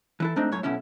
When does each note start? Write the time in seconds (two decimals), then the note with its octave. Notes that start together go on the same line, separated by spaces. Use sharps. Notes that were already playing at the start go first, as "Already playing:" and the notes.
0.20 E3 E4 A4
0.36 G#2 A3 C4 D4 D#4
0.52 F#2 A2 C#5
0.63 B1 B2 C#4 E4